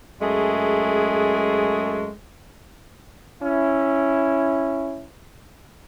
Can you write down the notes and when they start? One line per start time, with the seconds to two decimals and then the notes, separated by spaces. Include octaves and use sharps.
0.21 F#2 G#3 A3 G#4
3.42 C#4 E4